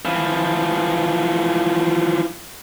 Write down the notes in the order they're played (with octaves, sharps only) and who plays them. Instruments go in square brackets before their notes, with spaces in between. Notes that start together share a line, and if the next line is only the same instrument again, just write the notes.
[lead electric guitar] E3 F3